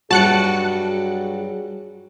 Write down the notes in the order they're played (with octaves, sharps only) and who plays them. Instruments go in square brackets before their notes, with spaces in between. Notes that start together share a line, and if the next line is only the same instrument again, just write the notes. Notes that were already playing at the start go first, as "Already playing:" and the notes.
[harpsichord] G2 F#3 [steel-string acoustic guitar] F#4 [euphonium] G#4 [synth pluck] A5 F#6 C#7